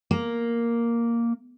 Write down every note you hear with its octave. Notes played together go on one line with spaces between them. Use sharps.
A#3